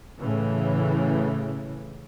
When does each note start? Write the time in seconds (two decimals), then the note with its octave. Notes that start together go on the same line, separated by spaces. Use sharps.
0.20 A2 C#3 E3